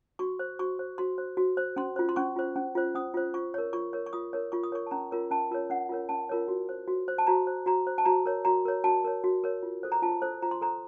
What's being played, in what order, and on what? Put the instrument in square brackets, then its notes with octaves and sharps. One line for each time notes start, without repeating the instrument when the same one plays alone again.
[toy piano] F#4 C#6
C5
F#4 C#6
C5
F#4 C6
C5
F#4
C5
C#4 C6
F4 C5
C6
C#4 C#6
F4 C5
C#4
F4 C5
C#4 D#6
F4 C5
F4 C#6
A#4 C#5
F4 C#6
A#4 C#5
C#6
F4 D#6
A#4 C#5
F4 C#6
D#6
A#4 C#5 C#6
A5
C#4 A#5
F4 A#4 C#5
C#4 A5
F4 A#4 C#5
C#4 F#5
F4 A#4 C#5
C#4 A5
F4 A#4 C#5
F#4
C5
F#4
C5
A5
F#4 A#5
C5
F#4 A#5
C5
A5
F#4 A#5
A#4 C#5
F#4 A#5
A#4 C#5
F#4 A5
A#4 C#5
F#4
A#4 C#5
F4
A4 C5
A#5
F4 A5
A4 C5
F4 A#5
C6
A4 C5 A#5